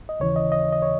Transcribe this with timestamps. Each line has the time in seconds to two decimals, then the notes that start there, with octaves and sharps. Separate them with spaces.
0.09 D#5
0.20 D#2 C#3 E3 C#5
0.36 D#5
0.52 D#5
0.72 D#5
0.82 C#5